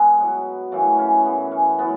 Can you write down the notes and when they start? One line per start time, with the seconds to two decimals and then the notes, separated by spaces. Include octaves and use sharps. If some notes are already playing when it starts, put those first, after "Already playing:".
Already playing: G#3 B3
0.17 B2 F#3
0.72 F#2 C#3 E3 A3
0.98 C#4
1.25 F#2 E3 B3
1.52 C#4
1.79 A2 F#3 B3